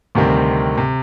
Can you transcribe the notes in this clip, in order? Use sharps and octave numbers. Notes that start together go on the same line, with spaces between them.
D2 C3 D#3 G3 C4
C3